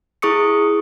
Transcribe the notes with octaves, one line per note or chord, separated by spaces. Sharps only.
E4 G#4 C#6 D#6 C#7